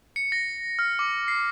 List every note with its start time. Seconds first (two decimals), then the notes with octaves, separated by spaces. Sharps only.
0.16 C#7
0.32 A#6
0.79 F6
0.99 D6
1.28 C7